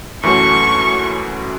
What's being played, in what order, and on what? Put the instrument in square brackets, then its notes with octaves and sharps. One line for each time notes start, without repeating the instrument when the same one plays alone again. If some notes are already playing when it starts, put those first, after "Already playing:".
[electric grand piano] F#2 E3 A3 C#4 F#4 [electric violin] C#6